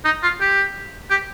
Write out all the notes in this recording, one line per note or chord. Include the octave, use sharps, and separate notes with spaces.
D#4
F4
G4
G4